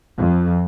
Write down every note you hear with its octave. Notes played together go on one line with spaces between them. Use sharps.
F2